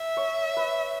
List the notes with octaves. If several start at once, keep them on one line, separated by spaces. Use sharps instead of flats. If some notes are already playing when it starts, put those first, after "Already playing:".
Already playing: E5
C#5
B4